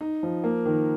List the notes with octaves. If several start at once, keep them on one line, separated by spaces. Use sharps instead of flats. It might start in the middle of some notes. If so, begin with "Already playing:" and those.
D#4
F3
A#3
D#3